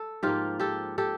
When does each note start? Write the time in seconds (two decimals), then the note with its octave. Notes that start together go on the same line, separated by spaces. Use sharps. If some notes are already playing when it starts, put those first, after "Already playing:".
Already playing: A4
0.23 G#2 F3 A#3 F4 G4
0.60 G4 A4
0.98 G4 A4